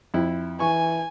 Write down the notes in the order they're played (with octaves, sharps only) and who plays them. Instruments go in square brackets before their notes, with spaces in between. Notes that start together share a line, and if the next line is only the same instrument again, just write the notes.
[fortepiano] F2 E4
[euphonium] E3 [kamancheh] G#5 [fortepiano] C#6